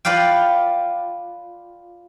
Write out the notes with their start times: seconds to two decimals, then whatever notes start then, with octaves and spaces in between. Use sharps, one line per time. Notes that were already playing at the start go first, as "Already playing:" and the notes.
0.05 F4 B4 D5 F5 G5